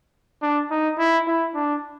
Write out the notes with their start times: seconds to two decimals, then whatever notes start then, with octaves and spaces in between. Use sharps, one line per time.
0.42 D4
0.71 D#4
0.98 E4
1.27 E4
1.55 D4